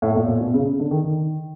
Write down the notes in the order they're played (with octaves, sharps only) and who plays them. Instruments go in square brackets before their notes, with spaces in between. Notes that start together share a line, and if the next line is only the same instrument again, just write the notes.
[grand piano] A2
A#2
A#2
B2
C#3
D3
D#3
D#3